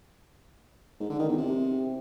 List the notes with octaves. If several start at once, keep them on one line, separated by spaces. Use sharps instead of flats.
G#2
D3
D#3
E2
C3